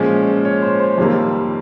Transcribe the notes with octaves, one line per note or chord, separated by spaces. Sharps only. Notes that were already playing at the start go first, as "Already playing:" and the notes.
Already playing: A#2 F3 G#3 C#4
C#5
C5
C5
F2 C3 D#3 G3 A#3